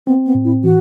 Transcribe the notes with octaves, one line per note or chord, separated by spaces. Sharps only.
B3 C4
B3
A2
E4
E3 F#4